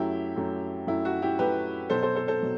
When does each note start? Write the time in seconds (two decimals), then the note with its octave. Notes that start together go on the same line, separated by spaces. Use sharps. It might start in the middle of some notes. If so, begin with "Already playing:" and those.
Already playing: F#2 F#3 A3 E4 G4
0.36 F#2 F#3 A3
0.87 F#2 F#3 A3 E4
1.05 F#4
1.22 E4 G4
1.38 F#2 F#3 A3 G4 B4
1.90 B2 F#3 B3 A4 C5
2.02 A4 C5
2.15 A4 C5
2.28 A4 C5
2.42 B2 F#3 B3